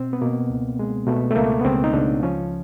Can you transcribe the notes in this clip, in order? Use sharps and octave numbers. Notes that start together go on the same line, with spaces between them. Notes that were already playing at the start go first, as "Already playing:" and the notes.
Already playing: B2 C4
B3
B2 A#3
C#2
G#3
B2 A3
A3
C#2 A#3
B3
C#2 C4
D#4
C#2 D4
F3 C#4